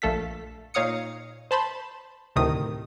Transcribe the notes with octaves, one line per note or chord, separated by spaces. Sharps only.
A#1 A3 A4 F5 B6
A#2 D#4 C#5 F5 D#6 C#7
C5 A5 B5 C6
D2 A2 C3 D#3 D#6